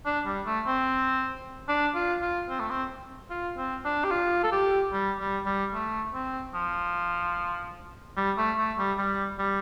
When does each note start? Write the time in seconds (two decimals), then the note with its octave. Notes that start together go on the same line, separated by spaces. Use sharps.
0.06 D4
0.26 G3
0.46 A3
0.67 C4
1.68 D4
1.95 F4
2.22 F4
2.49 C4
2.60 A3
2.70 C4
3.30 F4
3.57 C4
3.85 D4
4.04 G4
4.11 F4
4.43 A4
4.52 G4
4.92 G3
5.19 G3
5.46 G3
5.73 A3
6.14 C4
6.54 F3
8.17 G3
8.37 A3
8.57 A3
8.78 G3
8.98 G3
9.39 G3